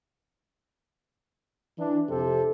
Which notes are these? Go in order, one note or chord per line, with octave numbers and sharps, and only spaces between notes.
E3 D4
F2 C3 G4 A4 C5